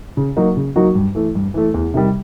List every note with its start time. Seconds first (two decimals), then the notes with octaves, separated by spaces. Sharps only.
0.17 C#3
0.37 F#3 A#3 D#4 F#4
0.57 C#3
0.76 F#3 A#3 D#4 F#4
0.95 G2
1.15 E3 A3
1.35 G2
1.54 E3 A3
1.74 E2
1.94 C3 D#3 G3